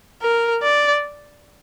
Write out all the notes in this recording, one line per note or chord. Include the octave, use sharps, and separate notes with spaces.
A#4
D5